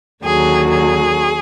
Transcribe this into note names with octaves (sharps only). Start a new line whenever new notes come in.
D#2 D3 F#3 G#4
G#4